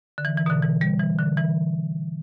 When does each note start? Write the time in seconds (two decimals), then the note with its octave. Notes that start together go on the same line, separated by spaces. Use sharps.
0.18 D3
0.25 E3
0.37 E3
0.46 B2
0.50 D3
0.63 E3
0.81 G3
0.99 E3
1.19 D3
1.37 E3